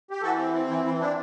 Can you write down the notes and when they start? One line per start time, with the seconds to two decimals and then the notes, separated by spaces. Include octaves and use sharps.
0.11 G4
0.22 E3 F#4 A4
0.38 C4
0.53 C4 E4
0.69 E3 E4
0.85 E3 E4
1.00 D4 E4